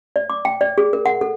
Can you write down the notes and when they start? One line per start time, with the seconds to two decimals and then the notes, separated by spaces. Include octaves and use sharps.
0.16 D5
0.30 D6
0.45 G5
0.61 D5
0.78 G#4
0.93 A#4
1.06 F#5
1.21 A4